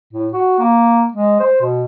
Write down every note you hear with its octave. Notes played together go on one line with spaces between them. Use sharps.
A2
F#4
A#3
G#3
C5
B2